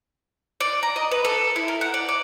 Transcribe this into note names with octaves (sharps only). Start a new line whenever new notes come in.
D5
A#5
D#5
B4
A4
E4
A#4
F#5
D5
D5